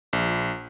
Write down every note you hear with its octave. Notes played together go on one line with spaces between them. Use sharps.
A#1